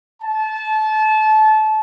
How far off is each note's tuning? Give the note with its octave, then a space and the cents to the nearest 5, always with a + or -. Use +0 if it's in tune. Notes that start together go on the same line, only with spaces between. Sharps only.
A5 -25